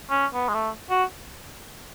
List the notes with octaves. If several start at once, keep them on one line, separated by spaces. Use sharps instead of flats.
C#4
B3
G#3
A3
F#4